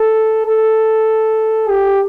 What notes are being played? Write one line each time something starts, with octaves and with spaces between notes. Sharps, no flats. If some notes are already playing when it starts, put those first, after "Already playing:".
Already playing: A4
A4
G4